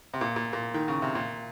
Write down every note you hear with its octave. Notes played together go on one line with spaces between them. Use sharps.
C3
A#2
A#2
A#2
D#3
C#3
C3
A#2